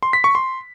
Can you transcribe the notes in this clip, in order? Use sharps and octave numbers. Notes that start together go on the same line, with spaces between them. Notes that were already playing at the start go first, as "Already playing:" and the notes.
C6
B6
C#6
C6